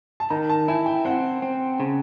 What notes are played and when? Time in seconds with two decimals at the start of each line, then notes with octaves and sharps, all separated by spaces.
0.20 A5
0.30 D#3 A#5
0.49 A5
0.68 E4 G#5
0.86 G5
1.05 C4 F#5
1.42 C4
1.80 C#3